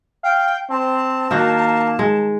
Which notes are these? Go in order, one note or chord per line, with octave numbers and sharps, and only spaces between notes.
F5 G5
C4 A5
D#3 A#3 D#4 F#4
G#3